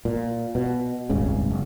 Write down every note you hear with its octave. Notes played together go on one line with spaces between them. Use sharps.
A#2
B2
D#1 G#1 C#2 C#3
F#1